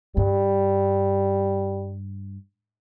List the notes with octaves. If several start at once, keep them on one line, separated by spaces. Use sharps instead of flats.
G2 G3